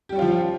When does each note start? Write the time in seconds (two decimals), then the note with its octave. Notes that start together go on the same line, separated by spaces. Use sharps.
0.09 G4
0.12 G3
0.16 C#4
0.19 F4
0.22 F3